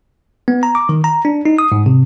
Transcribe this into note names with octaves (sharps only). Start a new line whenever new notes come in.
B3
A#5
D6
D#3
A#5
D4
D#4
D#6
G#2
C3